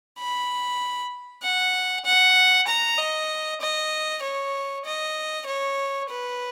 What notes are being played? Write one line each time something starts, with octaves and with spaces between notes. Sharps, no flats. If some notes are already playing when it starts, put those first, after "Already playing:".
B5
F#5
F#5
A#5
D#5
D#5
C#5
D#5
C#5
B4